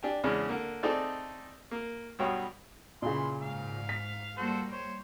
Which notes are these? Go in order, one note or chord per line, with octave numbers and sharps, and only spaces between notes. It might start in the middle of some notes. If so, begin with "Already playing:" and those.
D4 G4 G#5
E2 C#3 G#3 C#4 D4
D3 A#3
A3 C4 D#4 G#4 A4 D5
A#3
B1 G2 B2 C#5 F5 G5
A#2 C#3 E3 C6
G#2 F5
B6
G3 A#3 F#4 A4 C5
C5 C#5